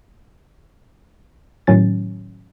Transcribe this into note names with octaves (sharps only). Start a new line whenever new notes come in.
A2 D#3 F#3 C#4 A6